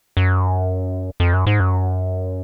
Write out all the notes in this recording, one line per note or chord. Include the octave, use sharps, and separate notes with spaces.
F#2
F2
F#2
G#2
F#2